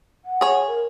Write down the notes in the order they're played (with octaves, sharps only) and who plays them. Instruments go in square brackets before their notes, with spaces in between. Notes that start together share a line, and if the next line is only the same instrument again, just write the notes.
[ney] F#5
[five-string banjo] G#4 C#5
[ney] A#4